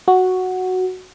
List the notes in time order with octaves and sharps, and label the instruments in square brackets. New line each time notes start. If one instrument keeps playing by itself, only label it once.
[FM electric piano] F#4